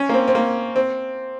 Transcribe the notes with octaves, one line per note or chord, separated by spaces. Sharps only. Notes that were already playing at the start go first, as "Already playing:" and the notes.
Already playing: C#4
A#3
C4
C4
A#3
C4